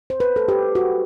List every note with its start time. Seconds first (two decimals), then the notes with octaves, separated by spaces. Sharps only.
0.10 C5
0.20 B4
0.36 A4
0.48 G4
0.75 F#4